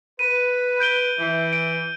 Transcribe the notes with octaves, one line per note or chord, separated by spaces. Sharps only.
B4 D#7
G6 D7 G7
E3
D7